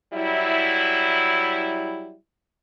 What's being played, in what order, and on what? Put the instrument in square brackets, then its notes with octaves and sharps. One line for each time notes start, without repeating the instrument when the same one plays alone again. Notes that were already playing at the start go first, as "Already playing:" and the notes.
[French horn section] F#3 G3 E4